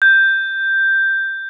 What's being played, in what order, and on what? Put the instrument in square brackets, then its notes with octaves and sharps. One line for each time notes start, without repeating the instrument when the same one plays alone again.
[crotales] G6